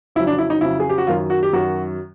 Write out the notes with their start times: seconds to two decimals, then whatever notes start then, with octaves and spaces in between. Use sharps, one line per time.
0.15 F2 C#3 F#3 E4
0.27 D4
0.38 E4
0.50 D#4
0.61 F2 C#3 F#3 E4
0.80 G#4
0.89 G4
0.98 F#4
1.07 F#2 D#3 F#3 F4
1.30 F#4
1.43 G4
1.53 F#2 D#3 F#3 F#4